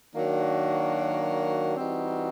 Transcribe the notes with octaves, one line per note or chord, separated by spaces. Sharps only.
D#3 F#3 A#3 D4 F#4
E3 G3 C4 D#4 F#4